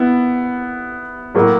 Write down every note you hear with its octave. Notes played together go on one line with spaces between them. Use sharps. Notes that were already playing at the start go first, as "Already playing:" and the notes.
Already playing: B3 E4
A2 F#3 A#3